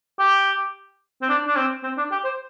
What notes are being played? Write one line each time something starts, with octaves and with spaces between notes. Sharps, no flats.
G4
C4
D4
D4
C4
C4
D4
G4
C5